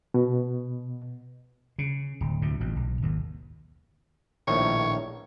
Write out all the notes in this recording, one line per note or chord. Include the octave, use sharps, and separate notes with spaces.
B2
C#3
D1
D2 A2 C3
A1 B2
B1
G#1 D#2
A#1 A2 D#3 C#5